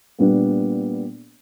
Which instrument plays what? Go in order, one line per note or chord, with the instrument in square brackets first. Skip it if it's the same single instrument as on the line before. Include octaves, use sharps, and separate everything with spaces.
[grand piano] A#2 G3 B3 D4